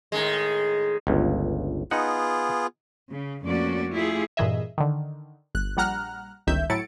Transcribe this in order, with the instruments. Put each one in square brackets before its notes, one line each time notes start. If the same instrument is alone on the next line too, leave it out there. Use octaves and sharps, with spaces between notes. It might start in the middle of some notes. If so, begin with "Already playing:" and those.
[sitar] A2 D#3 G#3
[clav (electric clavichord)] G1 C#2
[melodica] B3 F4 G#4 [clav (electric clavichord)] D#4 F#5
[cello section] C#3
F2 A3 A#3 C#4 F#4 D5
A3 E4 F4 G4 G#4
[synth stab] G2 A#2 E3 G#4 D#5 E5
D3 D#3
G1 F#6
A#1 G3 F#5 A#5 F6 F#6
G1 C#2 D#3 E5 G6
A2 F#3 E4 A6 C#7 D7